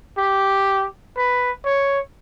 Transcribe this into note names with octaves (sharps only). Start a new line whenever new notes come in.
G4
B4
C#5